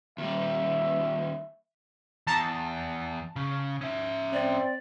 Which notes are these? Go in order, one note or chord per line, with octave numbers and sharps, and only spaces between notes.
D#2 G3 E5
E2 A5 A#5
C#3
C#4 E5
C4 D5